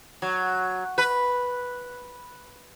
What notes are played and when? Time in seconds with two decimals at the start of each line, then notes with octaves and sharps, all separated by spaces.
0.22 F#3
0.98 B4